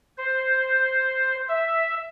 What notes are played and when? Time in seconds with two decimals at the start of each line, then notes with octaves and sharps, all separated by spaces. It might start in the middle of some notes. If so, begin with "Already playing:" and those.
0.18 C5
1.49 E5